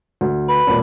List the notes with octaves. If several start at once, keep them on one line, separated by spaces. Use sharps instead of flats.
D2
B4
E1 A#2